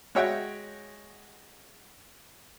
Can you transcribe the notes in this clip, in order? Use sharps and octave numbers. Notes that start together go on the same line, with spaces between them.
G#3 F#4 C#5 E5 F#5 G5